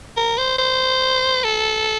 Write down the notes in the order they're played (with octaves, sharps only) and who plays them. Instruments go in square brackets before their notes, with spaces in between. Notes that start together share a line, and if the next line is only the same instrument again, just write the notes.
[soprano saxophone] A#4
C5
C5
A4